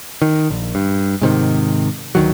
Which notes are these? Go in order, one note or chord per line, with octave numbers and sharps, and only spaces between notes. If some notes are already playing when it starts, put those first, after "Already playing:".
D#3
A#1
G2
G#2 C3 D#3
D2 D#3 F#3